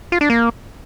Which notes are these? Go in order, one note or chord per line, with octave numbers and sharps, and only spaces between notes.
F4
D4
A#3